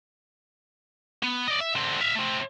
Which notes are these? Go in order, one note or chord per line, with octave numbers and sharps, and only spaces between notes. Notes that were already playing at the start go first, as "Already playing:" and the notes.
B3
D5 D#5
E5
D3 C4
E5 F5
A3 C4